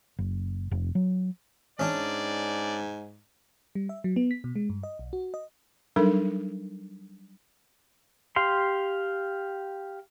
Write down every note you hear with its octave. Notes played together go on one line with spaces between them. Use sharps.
F#1
F1
F#3
G#2 C#4 D4 D5
G3
E5
F#3
B3
B6
B2
G#3
G2
D#5
B1
F#4
D#5
F#3 G3 D4 D#4 A4 A#4
G4 F5 C6